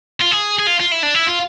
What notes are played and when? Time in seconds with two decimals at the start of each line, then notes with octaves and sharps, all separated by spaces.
0.21 F4
0.31 G#4
0.59 G#4
0.67 F4
0.80 F4
0.91 E4
1.03 D4
1.14 E4
1.27 F4